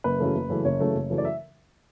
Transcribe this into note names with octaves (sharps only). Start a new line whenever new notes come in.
F#1 B4
F#2 C#3 E3 A3
F#1
F#2 C#3 E3 A3
F#1 C#5
F#2 C#3 E3 A3
F#1
F#2 C#3 E3 A3
D5
E5